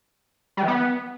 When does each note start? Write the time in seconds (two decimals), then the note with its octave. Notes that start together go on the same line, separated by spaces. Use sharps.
0.57 G3
0.63 E3
0.68 B3